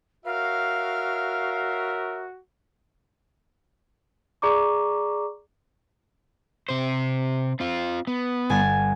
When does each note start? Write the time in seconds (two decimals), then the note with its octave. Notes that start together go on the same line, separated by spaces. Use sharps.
0.25 F#4 A#4 C#5 E5 F5
4.42 G#4 D5 A#5 C#6 D6
6.69 C3 C5
7.60 C4 F4
8.07 B3
8.50 G1 G#5 A6